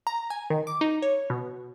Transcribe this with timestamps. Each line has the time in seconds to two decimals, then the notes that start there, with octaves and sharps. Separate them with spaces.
0.07 A#5
0.30 G#5
0.50 D#3
0.67 D6
0.81 D#4
1.02 C#5
1.30 B2